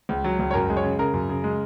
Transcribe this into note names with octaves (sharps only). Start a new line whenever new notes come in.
C#2
F#3
C#2
C#5
F#2 A#4
G#3
C#5
C#3
C#3 A#4
F#2
C#3
G#3